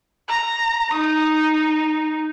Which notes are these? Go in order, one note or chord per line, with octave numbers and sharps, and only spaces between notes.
A#5
D#4 D#6